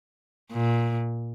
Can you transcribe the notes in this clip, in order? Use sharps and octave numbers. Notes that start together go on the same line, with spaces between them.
A#2